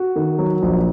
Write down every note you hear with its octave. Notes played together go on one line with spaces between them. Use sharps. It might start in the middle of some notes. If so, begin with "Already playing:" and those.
Already playing: F#4
D#3
F#3
A#1